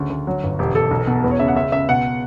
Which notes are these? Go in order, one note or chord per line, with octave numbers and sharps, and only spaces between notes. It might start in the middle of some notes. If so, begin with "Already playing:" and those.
Already playing: D2 C#3
D2
F#3
G1
E1 G4
E1 A4
B1
B2
E2 B4
C#5
C#3 E5
F#5
C#2 E5
C#2 E5
B2 F#5